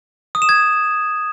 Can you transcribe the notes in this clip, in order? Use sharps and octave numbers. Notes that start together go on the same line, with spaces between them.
D#6
E7
G#6